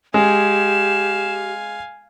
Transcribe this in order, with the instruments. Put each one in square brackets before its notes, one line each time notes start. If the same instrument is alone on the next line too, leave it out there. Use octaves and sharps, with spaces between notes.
[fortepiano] G#3 [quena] G4 [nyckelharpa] F5 G#5 [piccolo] E7